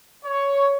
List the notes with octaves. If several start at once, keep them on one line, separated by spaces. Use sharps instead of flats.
C#5